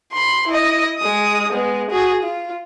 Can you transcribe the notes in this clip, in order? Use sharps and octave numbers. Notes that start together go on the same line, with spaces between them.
B5 C6
E4 D#5
G#3 D#6
G#3 B3
F#4 G#4
F4